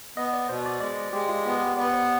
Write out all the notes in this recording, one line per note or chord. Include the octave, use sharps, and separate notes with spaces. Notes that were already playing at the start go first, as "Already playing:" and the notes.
B3 D#5
D5
B2 C5
D5
G#3 D5
G#3 G4
F4
B3 G4
G4
B3 D5
C5